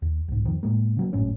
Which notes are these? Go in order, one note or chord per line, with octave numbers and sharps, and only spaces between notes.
D#2
C2 G#2
F2 D#3 F3
A2 G#3 A#3
C#3 F#3 A#3
G#1 F#2 A2 C#4